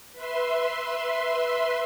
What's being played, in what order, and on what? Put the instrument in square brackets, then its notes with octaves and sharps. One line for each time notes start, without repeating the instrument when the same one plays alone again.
[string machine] B4 E5 C6